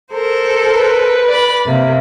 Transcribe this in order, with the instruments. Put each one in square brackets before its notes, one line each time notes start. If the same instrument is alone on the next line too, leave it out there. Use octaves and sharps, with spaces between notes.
[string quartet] A4 A#4 C5
[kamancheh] B4
[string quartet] D5 B5
C3 A#3